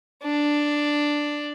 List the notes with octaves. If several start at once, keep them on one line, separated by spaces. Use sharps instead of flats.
D4